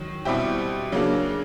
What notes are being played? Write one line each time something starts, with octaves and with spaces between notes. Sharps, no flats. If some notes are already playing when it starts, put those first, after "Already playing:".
Already playing: D#3 F#3
B2 G3 C4 E4 G4
C#3 F#3 A#3 D4